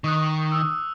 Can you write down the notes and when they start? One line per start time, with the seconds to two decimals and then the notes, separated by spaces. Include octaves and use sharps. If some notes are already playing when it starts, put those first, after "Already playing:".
0.04 D#3 C#6 D#6 F#6
0.52 E6